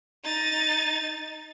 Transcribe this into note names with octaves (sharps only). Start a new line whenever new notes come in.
D#4 A6